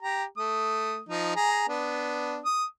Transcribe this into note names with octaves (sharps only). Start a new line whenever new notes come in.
G4 A#5
A3 D#6
F3 D#4
G#4 A#5
B3 D4
D#6